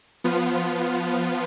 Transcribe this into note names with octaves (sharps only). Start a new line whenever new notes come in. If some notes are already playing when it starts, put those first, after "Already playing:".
F3 B3 F4